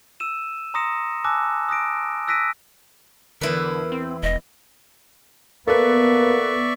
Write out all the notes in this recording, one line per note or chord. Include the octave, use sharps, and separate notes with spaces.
E6 D#7 E7
A#5 C6 D#6 A#6 C#7 E7
G#5 A5 D6 E6 F#6 A#6
D#6 F#6 A#6 D7
E6 F#6 A#6 B6 D7 D#7
E2 D3 E4 A#4 B4
C4
E1 D#5
A#3 B3 A4 B4 D5 E5 C#6